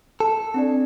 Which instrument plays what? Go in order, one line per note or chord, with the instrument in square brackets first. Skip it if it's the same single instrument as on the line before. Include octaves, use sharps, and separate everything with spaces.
[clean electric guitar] A4
[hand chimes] C4 D4 D5